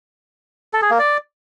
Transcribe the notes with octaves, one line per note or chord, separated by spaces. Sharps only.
A4
G#4
A#3
D5